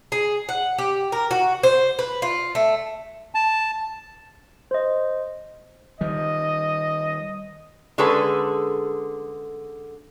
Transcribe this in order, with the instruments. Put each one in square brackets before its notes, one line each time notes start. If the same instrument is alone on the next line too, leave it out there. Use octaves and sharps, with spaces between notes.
[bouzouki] G#4
F#5
G4
A#4
F#4
C5
B4
F4
A3
[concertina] A5
[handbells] C5 D#5
[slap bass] D#3 G3 [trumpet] D#5
[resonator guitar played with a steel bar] D3 G#3 C#4 G#4 A4 B4